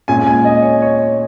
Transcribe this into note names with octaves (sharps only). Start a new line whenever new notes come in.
A#2 G#3 C#4 G#5
G#5
D#5
C#5
C#5